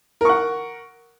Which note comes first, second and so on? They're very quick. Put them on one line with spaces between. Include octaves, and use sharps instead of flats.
A#4 C#6 F#5